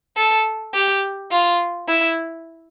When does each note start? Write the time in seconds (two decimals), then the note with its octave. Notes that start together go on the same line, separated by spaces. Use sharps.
0.17 A4
0.74 G4
1.31 F4
1.88 E4